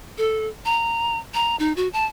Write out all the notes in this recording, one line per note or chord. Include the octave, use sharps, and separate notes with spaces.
A4
A#5
A#5
D#4
F#4
A5